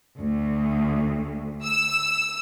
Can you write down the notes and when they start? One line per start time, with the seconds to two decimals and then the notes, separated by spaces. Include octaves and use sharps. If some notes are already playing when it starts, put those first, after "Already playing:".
0.19 D2
1.64 E6